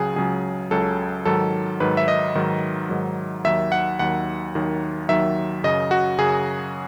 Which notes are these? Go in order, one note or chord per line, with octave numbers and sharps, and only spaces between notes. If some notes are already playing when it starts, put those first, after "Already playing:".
Already playing: C#2 C#3 F#3 G#4
C#2 C#3 F#3 G#4
C#2 C#3 F#3 A4
G#2 D#3 F#3 A4
G#2 D#3 F#3 B4
E5
D#5
G#2 D#3 F#3
G#2 D#3 F#3
D#2 D#3 F#3 E5
F#5
D#2 D#3 F#3 F#5
D#2 D#3 F#3
D#2 D#3 F#3 E5
F#2 C#3 F#3 D#5
F#4
F#2 C#3 F#3 G#4